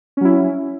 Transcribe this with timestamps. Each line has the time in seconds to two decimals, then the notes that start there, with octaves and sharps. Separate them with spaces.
0.17 C#4
0.21 F#3
0.25 E4